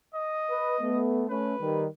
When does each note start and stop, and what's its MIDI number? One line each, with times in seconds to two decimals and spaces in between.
0.14 0.99 75
0.50 0.75 71
0.81 1.24 57
0.81 1.24 59
1.29 1.54 57
1.29 1.54 61
1.29 1.83 71
1.60 1.86 51
1.60 1.86 55